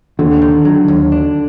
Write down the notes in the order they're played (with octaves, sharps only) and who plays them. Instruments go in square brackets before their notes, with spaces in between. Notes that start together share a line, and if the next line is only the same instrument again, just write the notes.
[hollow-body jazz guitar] D#2 [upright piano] D3
[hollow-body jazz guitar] D#3
[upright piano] D3 [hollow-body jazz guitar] F#3
[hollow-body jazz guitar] D#2
D4